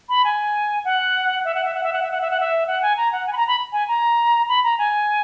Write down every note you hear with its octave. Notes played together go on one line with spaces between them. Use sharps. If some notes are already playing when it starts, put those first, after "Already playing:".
B5
G#5
F#5
E5
F#5
E5
F#5
E5
F#5
E5
F#5
E5
F#5
E5
F#5
G#5
A#5
F#5
G#5
B5
A#5
B5
G#5
A#5
B5
A#5
G#5